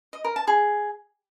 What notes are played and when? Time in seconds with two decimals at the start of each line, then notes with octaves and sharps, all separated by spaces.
0.13 D#5
0.24 A#4
0.36 A5
0.47 G#4